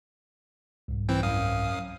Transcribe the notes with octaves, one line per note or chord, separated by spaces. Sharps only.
C2 G#2
E3 C4 G5
F#2 F5 D#6